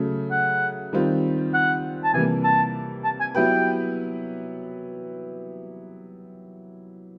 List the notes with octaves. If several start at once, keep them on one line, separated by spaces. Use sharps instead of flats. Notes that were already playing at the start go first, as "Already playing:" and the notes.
Already playing: C#3 F#3 A3
F#5
D#3 G3 C4 F4
F#5
A5
C3 E3 G3 A#3 G#5
A5
A5
G#5
F#3 B3 E4 G4 B4 G5